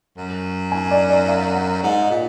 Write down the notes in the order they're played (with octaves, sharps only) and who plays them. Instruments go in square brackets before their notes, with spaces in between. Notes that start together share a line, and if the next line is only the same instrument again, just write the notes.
[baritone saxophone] F#2
[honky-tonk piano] G#5
D5
D5
F5
F#5
[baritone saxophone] G#2 [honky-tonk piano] F#5
[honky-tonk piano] D#5
[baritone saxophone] A#2